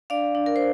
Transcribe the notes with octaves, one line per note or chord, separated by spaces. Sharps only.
D4 D5 F5
D4
A#4
C5